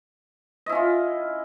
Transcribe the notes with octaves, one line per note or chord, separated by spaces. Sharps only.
C#4 E4 F4 D#5